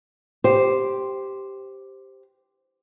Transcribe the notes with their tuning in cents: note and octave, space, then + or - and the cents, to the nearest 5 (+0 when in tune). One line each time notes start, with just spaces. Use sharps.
G4 +0 C5 +0